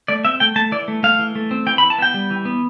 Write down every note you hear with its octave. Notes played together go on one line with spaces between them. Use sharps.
A3 D5
C4 E5
A3 G5
A3 A5
E3 D5
A3
A3 F5
E3
A3
C4
E3 G5
B5
E3
A5
B3 G5
G3
E3
B3